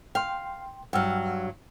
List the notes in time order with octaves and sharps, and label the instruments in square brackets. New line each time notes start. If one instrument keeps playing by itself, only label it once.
[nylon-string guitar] F5 [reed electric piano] G5 C6
[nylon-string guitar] G2 F#3 [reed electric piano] F#5 E6 F6